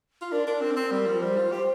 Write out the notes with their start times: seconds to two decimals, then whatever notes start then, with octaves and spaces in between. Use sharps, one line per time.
0.21 F4
0.32 D4 A#4
0.47 D4 A#4
0.61 C4
0.71 D4
0.76 C4
0.91 G3
1.07 F3
1.22 G3 C5
1.38 F4
1.51 G4 C5